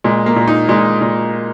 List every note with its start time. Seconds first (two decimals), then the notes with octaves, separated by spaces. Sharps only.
0.04 A#2 G#3
0.26 A#3
0.36 A#2
0.48 D#4
0.69 A#2 G#3
1.01 A#2